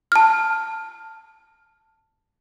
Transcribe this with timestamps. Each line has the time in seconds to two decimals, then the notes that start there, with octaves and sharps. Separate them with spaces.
0.12 A5 F6